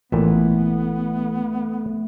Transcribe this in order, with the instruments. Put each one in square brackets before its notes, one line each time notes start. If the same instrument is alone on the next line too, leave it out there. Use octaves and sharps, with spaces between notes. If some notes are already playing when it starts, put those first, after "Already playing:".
[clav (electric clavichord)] A1 A#2 [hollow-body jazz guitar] E3 [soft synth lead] A3 [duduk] B3